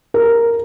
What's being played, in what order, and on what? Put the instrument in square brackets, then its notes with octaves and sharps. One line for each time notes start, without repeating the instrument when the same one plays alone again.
[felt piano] A#4